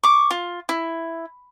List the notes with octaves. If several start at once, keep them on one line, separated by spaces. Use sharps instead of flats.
C#6 D6
F4
E4